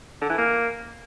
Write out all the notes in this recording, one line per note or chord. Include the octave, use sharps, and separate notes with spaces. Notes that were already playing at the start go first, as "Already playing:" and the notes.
D3
E3
A#3